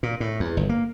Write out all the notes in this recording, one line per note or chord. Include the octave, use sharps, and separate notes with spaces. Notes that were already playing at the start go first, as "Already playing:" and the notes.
A#2
A2
E2
G1
A#3